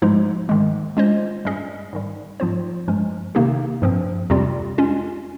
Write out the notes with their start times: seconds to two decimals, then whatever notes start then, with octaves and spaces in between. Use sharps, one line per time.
0.02 G#2 F3 G#3 D#4
0.49 G#2 D#3 G#3
0.97 G#3 C#4 F4 C5 D#5
1.45 G2 G3 C#4 G#4 D#5
1.93 G#2 D#3 G3
2.40 G#2 F3 C4 F4 C5
2.88 G2 F3 G#3 C#4
3.35 C3 D#3 A#3 D#4 G4
3.82 G2 F3 C4
4.30 F2 C3 G3 C4 F4
4.78 G#3 C#4 F4